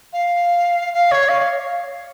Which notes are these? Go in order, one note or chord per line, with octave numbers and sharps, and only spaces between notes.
F5
F5
C#5
F5